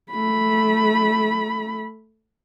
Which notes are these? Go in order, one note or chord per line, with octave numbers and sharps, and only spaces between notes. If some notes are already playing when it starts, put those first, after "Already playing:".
A3 B5